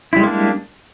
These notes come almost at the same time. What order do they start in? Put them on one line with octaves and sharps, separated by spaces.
E4 G3 G#3 A#3 D4